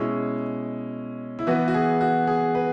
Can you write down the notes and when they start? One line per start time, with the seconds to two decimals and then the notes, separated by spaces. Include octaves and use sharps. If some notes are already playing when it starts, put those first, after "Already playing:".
Already playing: B2 G#3 C#4 E4
1.39 E4
1.47 E3 B3 F#4
1.68 F#4
1.74 G#4
2.01 F#4
2.27 G#4
2.55 B4